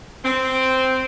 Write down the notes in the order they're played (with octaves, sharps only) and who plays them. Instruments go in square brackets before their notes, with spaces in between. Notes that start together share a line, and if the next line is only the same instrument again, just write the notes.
[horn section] C4